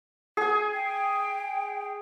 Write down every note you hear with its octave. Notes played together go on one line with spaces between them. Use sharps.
G#4 G#5
G5